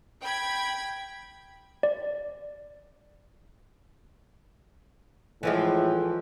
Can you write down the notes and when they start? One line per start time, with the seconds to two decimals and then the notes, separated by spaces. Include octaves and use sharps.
0.22 G5 B5 G#6
1.83 D5
5.43 A2 E3 F3 G#3